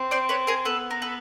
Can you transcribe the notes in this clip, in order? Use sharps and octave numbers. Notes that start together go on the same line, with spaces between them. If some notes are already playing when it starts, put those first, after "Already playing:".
Already playing: C4
C5 D5
B4 C#5
G#4 A#4
B3 A4 B4
A#4
A4 B4